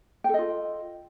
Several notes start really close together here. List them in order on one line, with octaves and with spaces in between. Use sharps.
G5 A4 D#5 F4